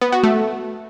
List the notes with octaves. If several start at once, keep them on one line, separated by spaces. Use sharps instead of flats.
B3
F#4
A3